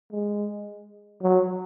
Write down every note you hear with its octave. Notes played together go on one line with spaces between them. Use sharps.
G#3
F#3